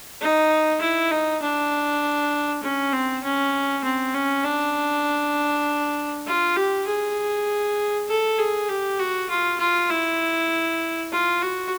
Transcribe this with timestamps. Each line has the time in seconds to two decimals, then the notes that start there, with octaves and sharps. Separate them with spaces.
0.21 D#4
0.81 E4
1.11 D#4
1.42 D4
2.63 C#4
2.93 C4
3.23 C#4
3.84 C4
4.14 C#4
4.44 D4
6.26 F4
6.56 G4
6.87 G#4
8.08 A4
8.38 G#4
8.69 G4
8.99 F#4
9.30 F4
9.59 F4
9.90 E4
11.12 F4
11.41 F#4